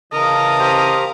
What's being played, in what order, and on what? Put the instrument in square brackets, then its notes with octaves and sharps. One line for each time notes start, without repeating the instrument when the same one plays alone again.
[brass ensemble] C#3 E3 A5 [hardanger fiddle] A#4 F5 [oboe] D#5
[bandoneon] G4 C5 A#5